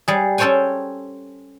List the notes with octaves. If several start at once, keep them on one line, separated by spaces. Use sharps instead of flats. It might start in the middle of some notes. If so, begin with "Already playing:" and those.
G3 G#4
C#4 A4 C5 C#5 G5 G#5